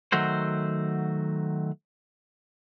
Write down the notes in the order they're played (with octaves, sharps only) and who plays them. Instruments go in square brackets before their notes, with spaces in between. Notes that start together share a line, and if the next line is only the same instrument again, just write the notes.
[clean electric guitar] D#3 F#3 A3 F#4 C5